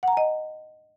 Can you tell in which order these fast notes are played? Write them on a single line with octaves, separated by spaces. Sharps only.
F#5 A#5 G#5 D#5